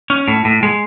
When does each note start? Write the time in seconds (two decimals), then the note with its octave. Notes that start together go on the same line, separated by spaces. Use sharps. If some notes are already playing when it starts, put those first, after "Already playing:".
0.10 C#4
0.28 A2
0.45 A2
0.63 G#3